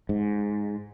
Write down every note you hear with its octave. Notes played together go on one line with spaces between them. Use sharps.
G#2